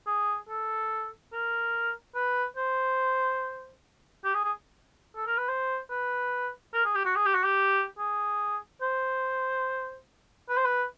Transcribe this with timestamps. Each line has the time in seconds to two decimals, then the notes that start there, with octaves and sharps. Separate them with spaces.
0.07 G#4
0.49 A4
1.33 A#4
2.15 B4
2.57 C5
4.25 G4
4.34 G#4
4.44 G#4
5.16 A4
5.27 A#4
5.38 B4
5.49 C5
5.90 B4
6.74 A#4
6.85 G#4
6.95 G4
7.05 F#4
7.16 G#4
7.26 G4
7.35 F#4
7.44 G4
7.99 G#4
8.82 C5
10.49 B4
10.58 C5
10.65 B4